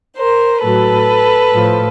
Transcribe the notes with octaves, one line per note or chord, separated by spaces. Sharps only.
A#4 C5
A2 F#3 A4 B4
A2 F3